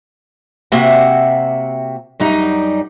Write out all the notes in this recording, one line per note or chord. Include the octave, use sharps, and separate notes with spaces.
C3 A#3 C4 F#4 E5 F#5
F#2 G3 D#4